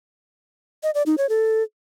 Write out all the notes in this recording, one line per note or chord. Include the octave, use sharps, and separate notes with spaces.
D#5
D5
D#4
C#5
A4